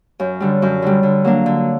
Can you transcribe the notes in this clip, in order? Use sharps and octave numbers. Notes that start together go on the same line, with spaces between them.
F#2
D3 G3
F#2
D3 G3
D3
F#3 A#3 D4
D3